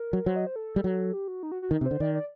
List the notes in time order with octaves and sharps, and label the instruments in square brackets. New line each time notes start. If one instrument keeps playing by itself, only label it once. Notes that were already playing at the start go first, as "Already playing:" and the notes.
Already playing: [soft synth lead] A#4
[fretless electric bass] F#3
[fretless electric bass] F#3 [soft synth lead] C5
[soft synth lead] D#5
C5
A4
[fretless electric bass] G3
F#3
[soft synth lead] G4
F#4
D#4
F#4
F#4
[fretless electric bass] D#3 [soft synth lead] D#4
[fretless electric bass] C3
[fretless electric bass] D3 [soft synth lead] C5
[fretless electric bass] D#3 [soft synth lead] D5
[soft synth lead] D5